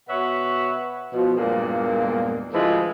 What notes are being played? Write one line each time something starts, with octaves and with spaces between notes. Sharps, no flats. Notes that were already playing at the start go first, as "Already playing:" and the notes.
B2 B4 C#5 E5 F#5
B2 F3
E2 G2 A#2 G#3 A#3
D2 C#3 E3 F3 G#3 B4